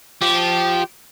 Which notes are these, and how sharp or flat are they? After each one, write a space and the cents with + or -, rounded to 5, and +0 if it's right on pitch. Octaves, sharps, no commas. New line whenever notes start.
F3 +0 G4 -10